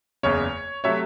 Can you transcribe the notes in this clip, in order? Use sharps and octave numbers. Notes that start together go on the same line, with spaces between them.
F#1 E2 C#3 C#5
C3 F#3 A3 C#5 E5